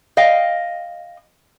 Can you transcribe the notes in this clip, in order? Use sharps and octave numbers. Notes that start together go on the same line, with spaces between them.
D#5 F5 G5